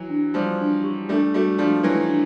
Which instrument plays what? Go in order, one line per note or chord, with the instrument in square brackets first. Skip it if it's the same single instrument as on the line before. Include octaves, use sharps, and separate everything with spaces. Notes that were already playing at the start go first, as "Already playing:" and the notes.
Already playing: [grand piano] E3 F#3
[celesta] D4
[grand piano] F3 G3 [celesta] C5
[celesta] D4
G4
[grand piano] G3 A3 [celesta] D4
[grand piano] G3 A3 [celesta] F#4
[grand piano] F3 G3 [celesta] D4
[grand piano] E3 F#3 [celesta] B4
[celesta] D4